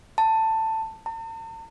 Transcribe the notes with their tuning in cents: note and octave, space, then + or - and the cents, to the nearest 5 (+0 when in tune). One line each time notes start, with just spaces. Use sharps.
A5 +15
A5 +45